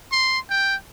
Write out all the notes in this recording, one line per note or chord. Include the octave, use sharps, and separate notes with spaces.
C6
G5